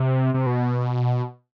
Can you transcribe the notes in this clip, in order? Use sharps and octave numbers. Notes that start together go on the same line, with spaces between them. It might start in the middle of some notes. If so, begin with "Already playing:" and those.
Already playing: C3
C3
B2